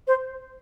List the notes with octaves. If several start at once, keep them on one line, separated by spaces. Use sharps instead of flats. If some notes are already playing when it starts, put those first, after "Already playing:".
C5